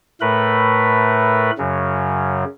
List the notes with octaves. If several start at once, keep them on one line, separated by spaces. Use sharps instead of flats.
A2 A3 A#4 B4 B5
F#2 C#3 F#3